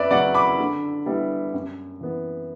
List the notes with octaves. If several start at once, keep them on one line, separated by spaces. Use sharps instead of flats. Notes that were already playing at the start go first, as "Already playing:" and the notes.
Already playing: F#2 B4 D5 E5
C#3 F#3 C#4 D5 F#5
B5 D6
D3
G3 B3 E4
F#2
E3 B3